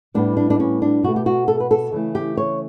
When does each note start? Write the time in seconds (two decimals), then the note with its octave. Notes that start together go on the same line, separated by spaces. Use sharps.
0.14 A2 G3 B3 D4
0.37 D4
0.50 D4
0.60 C#4
0.82 D4
1.03 B2 A3 F#4
1.16 G4
1.26 F#4
1.48 A4
1.60 B4
1.71 A4
1.92 C#3 E3 A3
2.15 G4
2.37 C#5